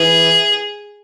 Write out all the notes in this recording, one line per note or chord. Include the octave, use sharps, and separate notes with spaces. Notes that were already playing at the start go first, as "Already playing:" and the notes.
Already playing: E3 G#4